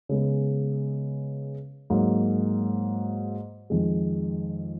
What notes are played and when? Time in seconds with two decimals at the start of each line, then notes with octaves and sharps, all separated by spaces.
0.09 C#3 G#3 B3
1.90 G#2 F#3 A#3
3.70 F2 D#3 G#3